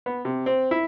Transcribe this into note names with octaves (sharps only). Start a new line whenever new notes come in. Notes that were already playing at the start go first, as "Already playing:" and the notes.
B3
C3
C4
E4